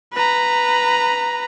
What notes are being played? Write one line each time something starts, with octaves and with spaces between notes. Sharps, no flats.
B4 A#5